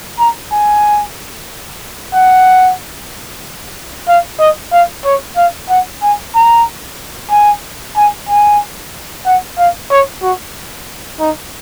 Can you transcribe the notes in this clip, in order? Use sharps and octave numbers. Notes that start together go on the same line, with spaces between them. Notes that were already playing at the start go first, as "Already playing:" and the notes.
A#5
G#5
F#5
F5
D#5
F5
C#5
F5
F#5
G#5
A#5
G#5
G#5
G#5
F#5
F5
C#5
F#4
D#4